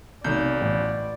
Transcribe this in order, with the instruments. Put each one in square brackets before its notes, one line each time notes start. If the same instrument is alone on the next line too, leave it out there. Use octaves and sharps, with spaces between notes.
[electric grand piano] B1 G6 [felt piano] C3 D#3 A3 [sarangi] D5
[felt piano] A1